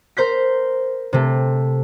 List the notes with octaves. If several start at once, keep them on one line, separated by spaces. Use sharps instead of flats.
A#4 C5 G6 B6
C3 A3